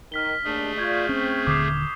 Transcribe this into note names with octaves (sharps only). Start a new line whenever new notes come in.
D#3 F6 B6 G7
D#2 A3 D4 G#4
F4 D5 C#6 G6 G#6
C4 C#4
D#1 D3 D6 D#6 C7